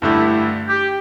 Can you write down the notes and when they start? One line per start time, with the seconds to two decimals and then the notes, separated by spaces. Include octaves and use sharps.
0.02 G2 D3 A3 D4 E4 G4
0.68 G4